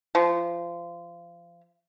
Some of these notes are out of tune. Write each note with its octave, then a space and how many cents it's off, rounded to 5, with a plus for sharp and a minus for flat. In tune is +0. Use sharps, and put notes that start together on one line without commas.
F3 -25